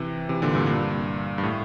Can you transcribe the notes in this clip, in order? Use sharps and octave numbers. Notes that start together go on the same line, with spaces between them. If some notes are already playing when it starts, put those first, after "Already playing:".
Already playing: C3 E3
C3 E3
A#2 D3
G2 A#2
G2 A#2
G2
A2